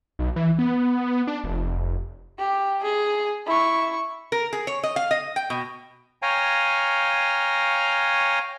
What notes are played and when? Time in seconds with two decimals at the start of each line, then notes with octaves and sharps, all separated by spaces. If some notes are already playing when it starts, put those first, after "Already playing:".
0.19 B1
0.36 E3
0.59 B3
1.27 D4
1.44 F1
2.38 G4
2.83 G#4
3.46 E4 C#6
4.32 A#4
4.53 G#4
4.67 C#5
4.83 D#5
4.96 F5
5.11 D#5
5.36 G5
5.50 B2
6.22 C#5 F5 G5 G#5 A#5